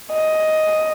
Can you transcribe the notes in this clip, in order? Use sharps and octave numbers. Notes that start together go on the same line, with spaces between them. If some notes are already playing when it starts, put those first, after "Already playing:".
D#5